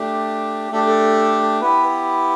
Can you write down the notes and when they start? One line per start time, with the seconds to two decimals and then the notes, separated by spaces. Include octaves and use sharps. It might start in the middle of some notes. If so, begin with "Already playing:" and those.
Already playing: A3 D4 G4
0.72 A3 D4 G4 A4
0.87 A4
1.61 B3 E4 G4 B4